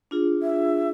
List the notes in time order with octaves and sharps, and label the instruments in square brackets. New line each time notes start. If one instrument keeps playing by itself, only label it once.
[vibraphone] D4 F4 G#4
[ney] E5